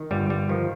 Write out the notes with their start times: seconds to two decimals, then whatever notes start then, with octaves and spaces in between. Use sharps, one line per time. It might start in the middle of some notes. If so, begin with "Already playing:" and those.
Already playing: D#3
0.11 G1 G3
0.30 G3
0.49 D#3 F3